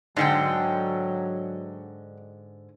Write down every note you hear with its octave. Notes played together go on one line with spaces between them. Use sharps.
G#2 D3 F#3 G#3 D4 F#5 G5